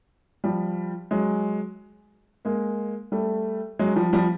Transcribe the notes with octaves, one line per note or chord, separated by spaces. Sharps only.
F3 G3
F#3 G#3
G#3 A#3
G3 A3
F#3 G#3
F3 G3
F3 G3